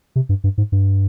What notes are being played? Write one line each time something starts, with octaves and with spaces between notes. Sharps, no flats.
C3
G2
G2
G#2
G2